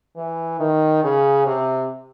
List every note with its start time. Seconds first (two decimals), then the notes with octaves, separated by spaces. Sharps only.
0.16 E3
0.60 D#3
1.03 C#3
1.46 C3